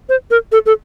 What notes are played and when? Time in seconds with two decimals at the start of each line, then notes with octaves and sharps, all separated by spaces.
0.09 C5
0.31 A#4
0.52 A4
0.66 A4